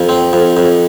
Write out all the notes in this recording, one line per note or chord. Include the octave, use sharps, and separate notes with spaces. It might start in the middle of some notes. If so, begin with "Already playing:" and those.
Already playing: F2
C4
F2
F2